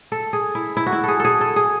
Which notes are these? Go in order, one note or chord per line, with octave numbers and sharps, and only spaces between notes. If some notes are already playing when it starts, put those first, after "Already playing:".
A4
G#4
E4
E4
F#4
E4
G#4 A4
G#4 A4
A4
G#4